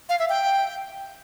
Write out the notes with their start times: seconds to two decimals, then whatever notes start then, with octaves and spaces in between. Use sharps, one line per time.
0.09 F5
0.19 E5
0.29 G5